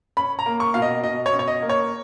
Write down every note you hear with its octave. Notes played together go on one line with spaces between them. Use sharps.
C#4 B5
A#5
A#3
C#6
B2 F5
D#5
B2 D#5
C#5
C#4
C#5
D#5
A#3
C#5